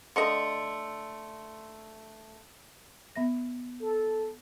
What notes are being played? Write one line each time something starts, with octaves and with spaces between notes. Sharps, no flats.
D3 A3 D#5 C6 C#7
B3 E5 A#6
A4